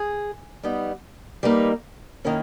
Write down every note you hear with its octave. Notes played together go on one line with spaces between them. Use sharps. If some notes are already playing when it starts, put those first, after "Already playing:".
Already playing: G#4
G3 B3 D#4
G3 A#3 D#4 B4
D#3 A#3 C#4 E4 A#4